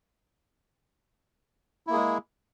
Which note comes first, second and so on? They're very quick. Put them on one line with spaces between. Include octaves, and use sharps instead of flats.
E4 A#3 G#4 G#3